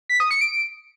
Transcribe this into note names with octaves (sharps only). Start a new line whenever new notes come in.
B6
D#6
C#7
D7